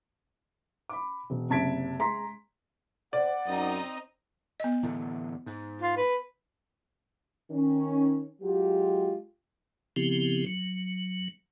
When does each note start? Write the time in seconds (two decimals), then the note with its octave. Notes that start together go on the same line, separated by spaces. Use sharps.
0.89 B5 D6
1.30 E1
1.50 F#1 C3 A5 G#6 B6 D7
1.99 G#3 A#5 C6 B6
3.13 C5 D5 F#5
3.46 F#2 C4 D#4 D#5
4.60 B3 D#5
4.83 E2 A2 D3
5.46 G#2
5.82 F4
5.97 B4
7.51 D#3 C#4
8.42 F#3 G#3 F4 G4
9.96 C#3 F3 B3 C4 E4 G4
10.47 F#3